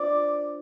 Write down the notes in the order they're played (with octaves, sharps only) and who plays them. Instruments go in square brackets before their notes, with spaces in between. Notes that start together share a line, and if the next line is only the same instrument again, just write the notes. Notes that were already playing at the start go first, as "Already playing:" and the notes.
Already playing: [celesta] D4 F4 C5 [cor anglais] D5